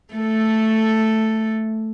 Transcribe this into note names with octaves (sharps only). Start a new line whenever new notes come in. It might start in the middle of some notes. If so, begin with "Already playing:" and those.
A3 A4